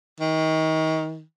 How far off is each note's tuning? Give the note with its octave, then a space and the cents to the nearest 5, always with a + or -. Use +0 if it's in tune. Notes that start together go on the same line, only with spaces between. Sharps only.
D#3 +30